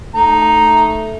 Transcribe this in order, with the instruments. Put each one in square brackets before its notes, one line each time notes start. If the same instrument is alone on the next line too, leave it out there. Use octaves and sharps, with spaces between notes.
[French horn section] A3 [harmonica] D#4 A#5